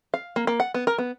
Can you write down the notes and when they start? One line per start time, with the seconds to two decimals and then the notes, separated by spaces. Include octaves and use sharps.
0.14 F5
0.36 A#3
0.47 A#3
0.60 F#5
0.74 B3
0.87 A#4
0.98 B3